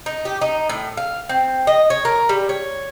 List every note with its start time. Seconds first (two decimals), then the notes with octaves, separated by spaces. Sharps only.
0.06 D#4
0.25 G4
0.41 D#4
0.69 A2
0.97 F5
1.29 C4
1.67 D#5
1.90 C#5
2.05 A#4
2.29 G3
2.49 C#5